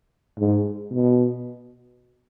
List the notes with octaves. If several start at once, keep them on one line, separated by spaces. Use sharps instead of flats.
G#2
B2